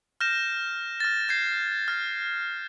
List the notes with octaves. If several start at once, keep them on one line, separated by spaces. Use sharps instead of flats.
F6 G6 A#6 E7
F6 A6
G6 G#6 C7
F6 A6